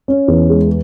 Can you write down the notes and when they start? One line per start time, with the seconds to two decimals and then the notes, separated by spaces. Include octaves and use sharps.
0.08 C#4
0.28 E2
0.50 G#3